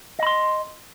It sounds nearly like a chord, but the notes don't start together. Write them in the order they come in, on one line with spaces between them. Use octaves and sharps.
D#5 B5 C6